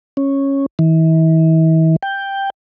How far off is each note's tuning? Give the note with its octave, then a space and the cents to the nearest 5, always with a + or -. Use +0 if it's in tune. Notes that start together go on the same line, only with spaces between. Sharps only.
C#4 -10
E3 -40
G5 +5